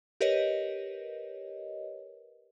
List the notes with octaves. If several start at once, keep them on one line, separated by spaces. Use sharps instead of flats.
G4 A#4 B4 C#5 D#5